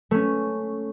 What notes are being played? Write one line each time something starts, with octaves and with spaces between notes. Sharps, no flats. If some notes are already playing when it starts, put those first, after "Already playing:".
A3 C#4